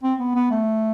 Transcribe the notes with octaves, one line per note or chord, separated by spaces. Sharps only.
C4
B3
B3
A3